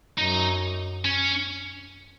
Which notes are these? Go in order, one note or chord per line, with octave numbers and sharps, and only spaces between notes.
F#2 D#4
C#4